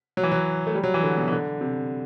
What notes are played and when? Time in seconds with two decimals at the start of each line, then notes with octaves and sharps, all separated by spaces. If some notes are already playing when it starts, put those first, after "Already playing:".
0.17 F#3
0.23 E3
0.32 F#3
0.67 A3
0.75 G3
0.84 F#3
0.94 E3
1.03 D3
1.17 B2
1.28 E3
1.32 D3
1.61 C3